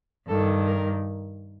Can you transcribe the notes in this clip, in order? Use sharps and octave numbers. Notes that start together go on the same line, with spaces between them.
G2 D#3 A4
A#4